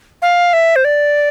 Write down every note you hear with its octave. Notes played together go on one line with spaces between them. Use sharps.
F5
E5
C5
D5